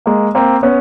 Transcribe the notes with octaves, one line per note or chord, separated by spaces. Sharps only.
G#3 A#3
A#3 C4
B3 C#4